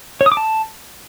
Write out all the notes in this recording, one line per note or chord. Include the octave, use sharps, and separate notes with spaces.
C#5
D#6
D6
A5